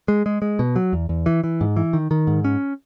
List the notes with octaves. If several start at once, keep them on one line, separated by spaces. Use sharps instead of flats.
G#3
G#3
G#3
B2
F#3
E2
E2
E3
E3
G#2
E3
D#3
D#3
G#2
C#4